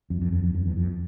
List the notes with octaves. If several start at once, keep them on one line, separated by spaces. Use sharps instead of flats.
F2
F2
F2
F2
F2
E2
F2